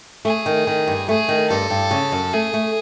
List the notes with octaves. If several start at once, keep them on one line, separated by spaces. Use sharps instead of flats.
A3 G#4
D#3
D#3
G2
A3 G#4
D#3
G2 A4
G2
C#3
F#2
A3 G#4
A3